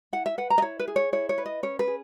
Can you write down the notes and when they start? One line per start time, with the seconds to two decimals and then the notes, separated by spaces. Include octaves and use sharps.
0.13 E4 F#5
0.26 E5
0.38 B4 F#5
0.50 A#5
0.58 D#5
0.62 E4 C#5
0.79 B4
0.88 G#4
0.96 C#5
1.13 E4 C#5
1.29 C#5
1.38 B4
1.46 D#5
1.63 C#4 C#5
1.79 B4
1.87 G#4